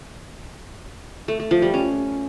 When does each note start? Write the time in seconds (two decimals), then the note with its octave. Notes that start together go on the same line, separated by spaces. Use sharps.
1.28 A3
1.40 A3
1.51 F3
1.62 G3
1.74 C#4